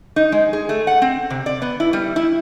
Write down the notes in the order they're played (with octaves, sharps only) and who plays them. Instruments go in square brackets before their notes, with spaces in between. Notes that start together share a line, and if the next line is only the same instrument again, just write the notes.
[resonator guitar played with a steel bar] D#4
G#3
G#4
A3
F#5
C4
C3
D5
B3
E4
G3
E4